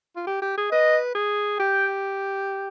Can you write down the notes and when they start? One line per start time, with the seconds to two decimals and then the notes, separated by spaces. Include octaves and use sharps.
0.16 F4
0.27 G4
0.42 G4
0.57 G#4
0.71 B4 D#5
1.15 G#4
1.59 G4 G5